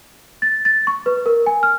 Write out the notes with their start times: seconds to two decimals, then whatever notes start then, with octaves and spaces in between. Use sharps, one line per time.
0.42 A6
0.65 A6
0.87 C#6
1.06 B4
1.26 A#4
1.46 G#5
1.63 F6